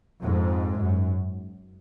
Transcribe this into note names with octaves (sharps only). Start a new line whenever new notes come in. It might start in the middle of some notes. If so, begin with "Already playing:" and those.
F2 G#2
F#2